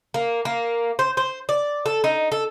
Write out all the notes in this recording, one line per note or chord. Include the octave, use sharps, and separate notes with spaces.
A#3
A#3
C5
C5
D5
A4
D#4
A4